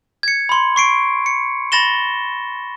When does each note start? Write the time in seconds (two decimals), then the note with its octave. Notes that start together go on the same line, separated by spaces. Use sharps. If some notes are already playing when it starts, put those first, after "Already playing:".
0.23 G#6 C#7
0.49 B5 C6
0.76 C#6 C7 D7
1.26 C#7
1.72 B5 A6 A#6 E7 G7